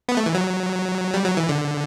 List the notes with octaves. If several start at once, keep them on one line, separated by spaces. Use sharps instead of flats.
B3
A3
E3
F#3
G3
F#3
E3
D3